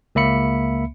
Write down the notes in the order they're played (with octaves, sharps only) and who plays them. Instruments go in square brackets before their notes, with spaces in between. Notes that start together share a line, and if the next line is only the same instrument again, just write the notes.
[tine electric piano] C#2 A#3 E5 B5 C#7